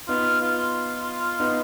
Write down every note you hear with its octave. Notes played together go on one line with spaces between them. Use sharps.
B3 D#4 F4
F4
B3 D#4